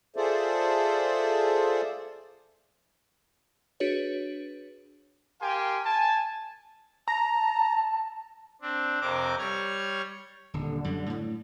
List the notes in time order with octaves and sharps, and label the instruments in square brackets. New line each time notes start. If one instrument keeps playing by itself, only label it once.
[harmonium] F4 G#4 A4 C5 D5 E5
[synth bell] D4 F#4 G#4 B4 C#5
[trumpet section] G4 A#4 F5 G5 G#5 C6
G#5 A5
[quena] A5 [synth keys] A#5
[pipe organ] C4 D4
F2 C3 C4 A#4 D6
G3 C#5 F6 G#6
[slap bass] D#1 [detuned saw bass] D3
[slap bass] F#2 G3
A2